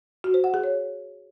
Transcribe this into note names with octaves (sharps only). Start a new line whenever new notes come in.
F#4
C5
F#5
G#4
C#5